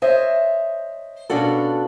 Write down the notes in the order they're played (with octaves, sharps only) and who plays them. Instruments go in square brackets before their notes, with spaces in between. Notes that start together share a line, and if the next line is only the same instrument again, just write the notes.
[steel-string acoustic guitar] C5 C#5 D#5 E5
B2 C#4 D4 F4 F#4 A4